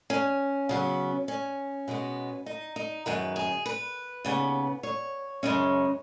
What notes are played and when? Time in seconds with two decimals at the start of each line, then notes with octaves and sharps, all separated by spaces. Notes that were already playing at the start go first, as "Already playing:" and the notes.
0.10 C#4
0.69 C#3 F#3 B3
1.28 C#4
1.88 B2 G#3 B3
2.46 D#4
2.76 D#4
3.06 F#2 D#3 G#3 B4
3.36 G#4
3.66 B4
4.24 D#2 C#3 B3
4.83 C#5
5.43 F#2 C#3 G#3 C#4